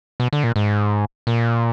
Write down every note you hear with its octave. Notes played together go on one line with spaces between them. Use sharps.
B2
D3
A#2
G#2
A#2